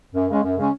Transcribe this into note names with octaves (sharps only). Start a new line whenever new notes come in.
F#2
C#3 G#3 C#4
F#2
C#3 G#3 C#4